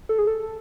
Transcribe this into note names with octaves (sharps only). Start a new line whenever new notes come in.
A4
G#4
A4